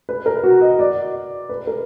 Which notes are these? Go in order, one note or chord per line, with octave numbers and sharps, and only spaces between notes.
B4
A#4
F#4
D#5
D5
B4
A#4